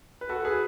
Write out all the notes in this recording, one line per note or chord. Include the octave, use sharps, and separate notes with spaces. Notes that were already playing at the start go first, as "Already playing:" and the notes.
B4
F#4 A4
G#4 B4